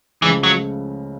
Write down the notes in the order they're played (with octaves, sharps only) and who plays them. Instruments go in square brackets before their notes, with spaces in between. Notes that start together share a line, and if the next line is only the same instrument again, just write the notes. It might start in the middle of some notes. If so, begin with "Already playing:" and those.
[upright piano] C#2 C#3 F3 A3 [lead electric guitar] E3
[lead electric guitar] F#3